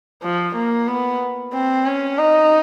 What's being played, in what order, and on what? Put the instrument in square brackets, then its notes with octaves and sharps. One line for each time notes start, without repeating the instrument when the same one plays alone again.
[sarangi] F3
A#3
B3
C4
C#4
D#4